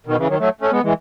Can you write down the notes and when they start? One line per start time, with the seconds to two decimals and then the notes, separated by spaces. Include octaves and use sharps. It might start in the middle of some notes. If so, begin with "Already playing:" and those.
0.06 B2 D#3
0.18 C#3 E3
0.28 D#3 F#3
0.39 F#3 A3
0.61 A3 C#4
0.72 G#3 B3
0.84 E3 G#3